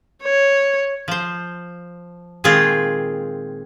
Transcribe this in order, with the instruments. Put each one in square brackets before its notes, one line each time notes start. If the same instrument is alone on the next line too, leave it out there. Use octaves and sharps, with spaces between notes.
[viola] C#5
[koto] F3 C5
A#2 D#3 G#3 C4 F4 G#4